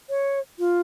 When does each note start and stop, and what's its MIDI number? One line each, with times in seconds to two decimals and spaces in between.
0.10 0.39 73
0.59 0.81 65